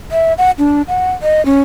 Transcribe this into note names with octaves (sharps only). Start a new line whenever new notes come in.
E5
F#5
D4
F#5
D#5
C#4